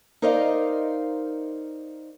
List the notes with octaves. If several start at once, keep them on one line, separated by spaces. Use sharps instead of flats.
D#4 A#4 C5 D5 D#5 F5